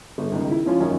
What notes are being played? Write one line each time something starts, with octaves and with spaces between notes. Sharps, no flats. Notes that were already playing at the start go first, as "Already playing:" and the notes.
G1
C#2 D#3
E4
F3 C#4 F4
F#2 D#3 C#4